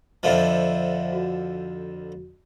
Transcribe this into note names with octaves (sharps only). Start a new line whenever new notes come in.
F2 D3 F3 C5 E5
F#4